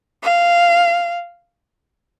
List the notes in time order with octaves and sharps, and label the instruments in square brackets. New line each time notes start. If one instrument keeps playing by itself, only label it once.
[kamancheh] F5